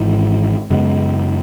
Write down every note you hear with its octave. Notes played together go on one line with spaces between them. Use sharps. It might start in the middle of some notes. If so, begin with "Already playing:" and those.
Already playing: G#1 G#2 E3
F#2 C#3 G#3 B3